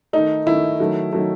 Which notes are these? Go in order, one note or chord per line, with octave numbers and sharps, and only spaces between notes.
D#3 A3 D#4
D#3 A3 E4
D#3 F#3 A3
D#3 F#3 A3